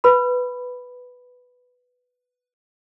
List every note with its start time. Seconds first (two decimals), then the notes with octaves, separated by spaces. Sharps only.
0.04 B4 B5